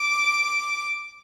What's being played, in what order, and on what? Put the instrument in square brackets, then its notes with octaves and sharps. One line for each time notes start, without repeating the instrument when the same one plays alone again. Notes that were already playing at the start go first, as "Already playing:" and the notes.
Already playing: [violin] D6